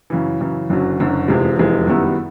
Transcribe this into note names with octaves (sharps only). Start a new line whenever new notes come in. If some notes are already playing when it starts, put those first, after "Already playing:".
F#2 C#3 E3
F#2 C#3 E3
F#1 F#2 D3 F#3
F#1 F#2 D3 F#3
F1 E2 C3 F3 G#3
F1 E2 C3 F3 G#3
F#2 D#3 G3 B3 E4